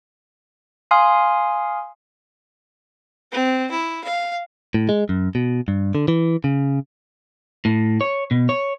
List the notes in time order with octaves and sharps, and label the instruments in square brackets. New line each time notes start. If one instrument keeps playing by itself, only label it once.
[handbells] F5 G#5 C6 D#6 F6
[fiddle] C4
E4
F5
[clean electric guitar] A2
G#3
F#2
B2
G2
D3
E3
C#3
A2
C#5
B2
C#5